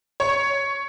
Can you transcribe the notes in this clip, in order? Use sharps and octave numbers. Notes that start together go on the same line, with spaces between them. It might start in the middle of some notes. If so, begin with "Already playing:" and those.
C#5